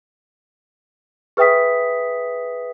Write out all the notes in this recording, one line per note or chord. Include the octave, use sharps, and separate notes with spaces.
G#4 B4 E5 G5 D#6 B6